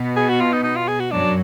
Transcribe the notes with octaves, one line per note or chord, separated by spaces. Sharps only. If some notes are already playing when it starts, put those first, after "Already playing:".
Already playing: B2 B3
G#4
F#4
F4
D#4
D#4
F4
G#4
F#4
F#2 F#3 D4